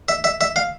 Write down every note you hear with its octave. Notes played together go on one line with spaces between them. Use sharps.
E5
E5
E5
F5